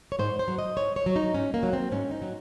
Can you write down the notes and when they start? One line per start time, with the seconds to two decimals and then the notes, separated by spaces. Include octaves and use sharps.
0.12 C#5
0.19 G#2 C5
0.39 C5
0.48 F#3
0.59 D#5
0.77 G#2 C#5
0.96 C#5
1.06 F#3
1.16 D#4
1.34 G#2 C#4
1.54 A#3
1.63 F#3
1.73 C4
1.92 G#2 C#4
2.11 D#4
2.22 F#3